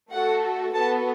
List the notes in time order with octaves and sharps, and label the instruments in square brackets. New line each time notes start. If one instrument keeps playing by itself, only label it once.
[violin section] A3 F#4 A4 F#5
B3 F#4 A4 A5